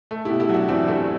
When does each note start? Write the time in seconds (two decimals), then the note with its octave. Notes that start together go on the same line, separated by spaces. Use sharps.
0.11 A3
0.25 B2 E4 G4
0.40 E4 G4
0.49 F#3 D4 F#4
0.68 E2 C4 E4
0.88 A3 E4 G4